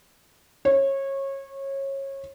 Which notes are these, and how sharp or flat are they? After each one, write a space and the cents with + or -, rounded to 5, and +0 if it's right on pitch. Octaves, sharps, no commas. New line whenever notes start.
C#5 -25